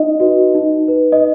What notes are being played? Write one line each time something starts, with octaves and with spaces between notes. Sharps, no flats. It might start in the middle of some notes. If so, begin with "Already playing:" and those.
Already playing: D#4 D#5
F#4 B4
D#4
B4
D#5